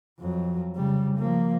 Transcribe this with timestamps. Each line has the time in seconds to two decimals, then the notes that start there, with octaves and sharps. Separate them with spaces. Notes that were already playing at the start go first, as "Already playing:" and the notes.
0.20 F2 F#3
0.75 C#3 G3
1.18 F3 A#3